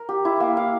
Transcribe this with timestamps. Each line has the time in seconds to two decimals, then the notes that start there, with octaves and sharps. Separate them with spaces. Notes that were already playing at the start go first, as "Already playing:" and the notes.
Already playing: A#4
0.09 G4
0.25 E4
0.40 A#3
0.57 F5